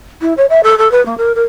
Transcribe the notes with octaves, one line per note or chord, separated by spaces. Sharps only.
E4
C#5
E5
A4
A4
B4
A#3
A#4
A#4